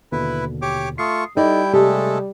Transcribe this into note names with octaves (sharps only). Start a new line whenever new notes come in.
D#2 B2 D3 E4 B4
G4 C#5 D6
A3 F4 C#6 D#6 C7
G3 D#4 E4 A4 D5 G5
C3 G#3 A3 G4 A4